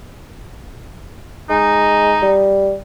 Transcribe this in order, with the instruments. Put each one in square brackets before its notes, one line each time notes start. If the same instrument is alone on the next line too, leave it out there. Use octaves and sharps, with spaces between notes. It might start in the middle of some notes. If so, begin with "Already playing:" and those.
[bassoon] G#3 [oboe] D#4
[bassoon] G3